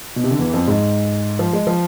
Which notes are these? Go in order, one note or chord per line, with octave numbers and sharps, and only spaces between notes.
B2
C3
D3
E2 E3
F2 F3
G#2 G#3
F3
G#3
F3